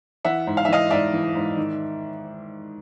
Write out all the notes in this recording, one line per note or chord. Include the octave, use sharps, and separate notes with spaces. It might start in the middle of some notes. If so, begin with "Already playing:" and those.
E3 E5 F#5
G#2
F5
E5
E3 D#5 F5
G#2 D5 E5
E3
G#2
D#3